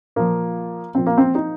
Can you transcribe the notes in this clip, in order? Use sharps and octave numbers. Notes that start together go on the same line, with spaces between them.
A#2 F3 A#3
A#2 F3 C4
A#3
C4
D#4